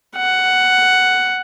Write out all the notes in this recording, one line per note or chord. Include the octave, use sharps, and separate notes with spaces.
F#5